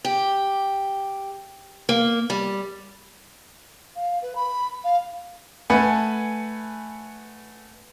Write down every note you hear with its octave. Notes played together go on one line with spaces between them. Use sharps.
G4
A#3
G3
F5
B4
B5
F5
A3 B4 F#5 G#5